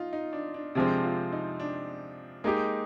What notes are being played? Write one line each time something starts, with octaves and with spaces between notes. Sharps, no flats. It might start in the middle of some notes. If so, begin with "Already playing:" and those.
Already playing: D#4 F4
D#4
D4
D4
C3 F3 G#3 C4 D4
F4
D#4
D4
G#3 A#3 D#4 G4